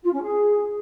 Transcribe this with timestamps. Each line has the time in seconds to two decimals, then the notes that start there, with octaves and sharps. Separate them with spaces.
0.04 F4
0.13 C#4
0.22 G#4